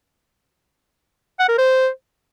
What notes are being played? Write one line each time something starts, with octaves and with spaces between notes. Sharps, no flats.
F#5
A#4
C5